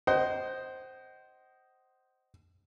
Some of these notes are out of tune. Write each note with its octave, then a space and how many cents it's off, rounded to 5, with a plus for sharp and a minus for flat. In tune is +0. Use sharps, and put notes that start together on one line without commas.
C5 +0 D#5 +0 F#5 +45